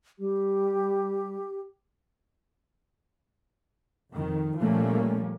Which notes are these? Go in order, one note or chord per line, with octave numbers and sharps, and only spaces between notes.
G3 G4
F2 D#3
A#2 F3 G3 A3 A#3 C#4